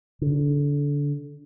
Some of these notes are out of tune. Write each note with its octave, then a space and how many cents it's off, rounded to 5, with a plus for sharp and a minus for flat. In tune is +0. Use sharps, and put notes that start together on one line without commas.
D3 -25